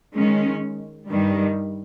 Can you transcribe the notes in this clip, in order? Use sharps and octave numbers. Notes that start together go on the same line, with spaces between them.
D#3 G#3 C#4
G2 D#3 G3